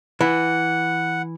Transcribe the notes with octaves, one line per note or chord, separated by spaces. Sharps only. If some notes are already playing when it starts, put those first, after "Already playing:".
E3 F#5